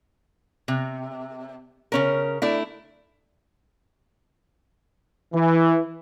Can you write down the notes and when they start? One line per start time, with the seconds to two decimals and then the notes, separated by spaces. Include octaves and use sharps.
0.68 C3
1.92 C#3 C#4 A#4
2.42 A3 D4 E4
5.34 E3